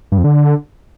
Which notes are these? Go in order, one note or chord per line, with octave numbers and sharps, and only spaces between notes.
G2
F2
D3